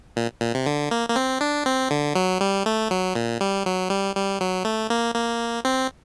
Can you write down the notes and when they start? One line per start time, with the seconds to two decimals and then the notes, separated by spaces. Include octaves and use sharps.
0.16 A#2
0.41 A#2
0.54 C3
0.66 D3
0.91 A#3
1.09 A#3
1.16 C4
1.41 D4
1.66 C4
1.91 D3
2.15 F#3
2.41 G3
2.66 A3
2.91 F#3
3.15 A#2
3.41 G3
3.66 F#3
3.90 G3
4.16 G3
4.41 F#3
4.65 A3
4.90 A#3
5.15 A#3
5.65 C4